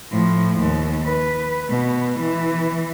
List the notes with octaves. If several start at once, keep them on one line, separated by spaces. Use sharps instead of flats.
A2 F3
D#2
B4
B2
E3